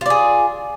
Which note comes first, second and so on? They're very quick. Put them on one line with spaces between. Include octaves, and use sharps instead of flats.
F4 D5 G#4